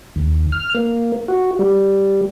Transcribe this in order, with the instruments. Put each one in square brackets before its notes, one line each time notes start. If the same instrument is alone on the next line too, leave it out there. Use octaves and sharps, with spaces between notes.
[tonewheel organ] D#2
F6
A#3
F#4
G3